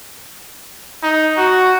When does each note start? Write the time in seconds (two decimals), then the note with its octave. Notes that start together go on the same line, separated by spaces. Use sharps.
1.03 D#4
1.38 F#4